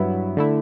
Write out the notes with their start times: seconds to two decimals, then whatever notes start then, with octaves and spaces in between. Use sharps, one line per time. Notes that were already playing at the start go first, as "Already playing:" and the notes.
Already playing: G2 F#3 B3 E4
0.37 D3 A3 E4